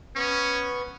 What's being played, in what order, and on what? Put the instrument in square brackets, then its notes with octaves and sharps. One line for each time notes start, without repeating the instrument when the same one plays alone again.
[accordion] B3 C#6 [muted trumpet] C#4